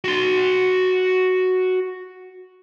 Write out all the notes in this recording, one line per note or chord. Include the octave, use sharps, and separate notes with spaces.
F#4 C6